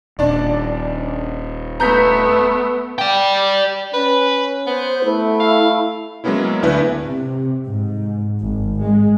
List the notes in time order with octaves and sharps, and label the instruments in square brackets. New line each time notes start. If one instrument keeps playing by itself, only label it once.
[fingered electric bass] D#1 [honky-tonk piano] D4 D5
[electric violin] A3 B3 [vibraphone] B4 [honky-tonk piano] A#5 G6 B6
[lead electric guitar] D5 G5
[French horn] C#4 [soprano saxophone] B4
[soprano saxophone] B3 [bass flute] C5
[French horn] A3 [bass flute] E4
[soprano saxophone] F5
[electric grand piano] F#3 G#3 A#3 B3 C#4 E4
D2 B3 D4 E4 B4
[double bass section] C3
G#2
G#1
G#3